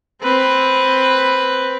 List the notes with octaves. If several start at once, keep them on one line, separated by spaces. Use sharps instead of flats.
C4 B4